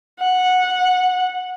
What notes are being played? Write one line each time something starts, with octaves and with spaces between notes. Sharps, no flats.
F#5